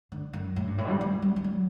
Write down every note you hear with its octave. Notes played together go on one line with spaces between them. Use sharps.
D3
F#2
A2
G2
A2
G3
G3
G3
G3
F#3